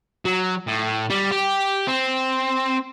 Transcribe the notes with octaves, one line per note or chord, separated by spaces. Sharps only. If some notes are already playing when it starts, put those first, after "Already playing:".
F#3
A2
G3
G4
C4